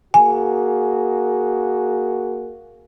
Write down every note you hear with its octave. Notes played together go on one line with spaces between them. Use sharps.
A#3 F#4 G#4 G#5